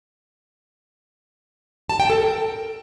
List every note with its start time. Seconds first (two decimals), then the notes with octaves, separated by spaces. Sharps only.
1.89 A5
2.00 G5
2.10 A4
2.20 A#4